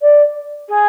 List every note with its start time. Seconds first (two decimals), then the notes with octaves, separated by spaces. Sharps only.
0.02 D5
0.69 G#4